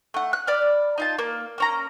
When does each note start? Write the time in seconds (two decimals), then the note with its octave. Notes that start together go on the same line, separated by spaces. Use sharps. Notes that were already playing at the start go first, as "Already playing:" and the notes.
0.14 A3 F#5
0.33 F#6
0.47 D5 B5 F6
0.98 D#4 F4 A5
1.19 A#3
1.58 A#3 C#4 A#5